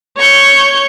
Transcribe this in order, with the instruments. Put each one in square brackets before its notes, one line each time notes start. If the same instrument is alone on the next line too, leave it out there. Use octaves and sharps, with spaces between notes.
[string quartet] C#5 C#6 G6